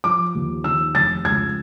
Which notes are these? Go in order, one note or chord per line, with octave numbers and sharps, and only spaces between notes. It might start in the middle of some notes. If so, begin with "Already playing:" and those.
F3 D6
D#2
D#3 E6
F1 A6
C#2 G#6